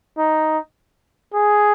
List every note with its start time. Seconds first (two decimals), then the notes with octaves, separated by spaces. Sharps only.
0.18 D#4
1.34 G#4